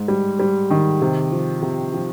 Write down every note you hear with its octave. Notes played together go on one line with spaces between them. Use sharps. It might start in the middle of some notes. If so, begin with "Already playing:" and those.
Already playing: G#2
G3
G3
D#3
C3
F3
C3
F3